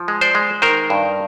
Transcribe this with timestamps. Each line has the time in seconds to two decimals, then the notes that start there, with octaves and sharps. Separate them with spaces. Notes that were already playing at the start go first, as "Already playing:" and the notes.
Already playing: F3
0.08 G#3
0.21 C5 D5
0.35 G#3
0.62 D#3 A#4 C5
0.90 G2